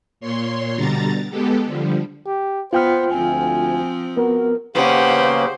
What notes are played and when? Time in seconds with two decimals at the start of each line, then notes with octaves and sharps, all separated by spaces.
0.20 A#2 C#5 C6
0.76 B2 D3 G3 A#5 A6
1.30 G#3 B3 G4 A4
1.66 D3 F3 G3
2.27 G4
2.73 B3 F4 C5 G5 F6
3.11 D2 F3 C4 G#5
4.17 B3 F#4 A#4
4.75 C#3 A#3 B3 C#4 G4 C5 F#5